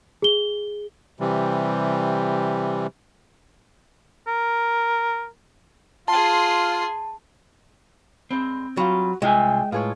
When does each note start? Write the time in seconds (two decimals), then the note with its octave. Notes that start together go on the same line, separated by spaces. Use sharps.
0.22 G#4 G7
1.20 C3 E3 G3
4.28 A#4
6.08 F4 G#4 A5 C6
8.31 G2 G#3 C4
8.77 F#3 G3 F4 F#4
9.22 C2 G#3 F4 E5 G5 G#5
9.72 A2 F4 G#4 B4 C#5